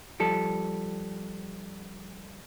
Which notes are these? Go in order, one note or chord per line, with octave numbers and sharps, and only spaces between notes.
F3 G3 A4